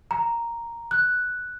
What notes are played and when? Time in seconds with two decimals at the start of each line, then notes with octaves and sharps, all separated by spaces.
0.11 A#5
0.91 F#6